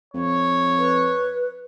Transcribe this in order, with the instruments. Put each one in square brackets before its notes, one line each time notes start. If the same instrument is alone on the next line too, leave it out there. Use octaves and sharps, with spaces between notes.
[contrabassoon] F2 [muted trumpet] C#5
[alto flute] B4